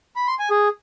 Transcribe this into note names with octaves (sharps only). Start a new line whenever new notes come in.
B5
C6
G#5
G#4